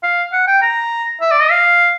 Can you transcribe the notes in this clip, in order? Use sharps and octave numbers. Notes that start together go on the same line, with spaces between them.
F5
F#5
G5
A#5
E5
D5
D#5
F5